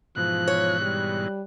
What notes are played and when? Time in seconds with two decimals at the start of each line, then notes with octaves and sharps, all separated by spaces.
0.17 G#2 B2 E3 F3 F#6
0.48 C#5
0.81 G3